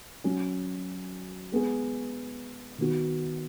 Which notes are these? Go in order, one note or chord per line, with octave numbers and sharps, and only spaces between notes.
F#3 C#4 F#4
G#3 B3 G#4
D#3 B3 F#4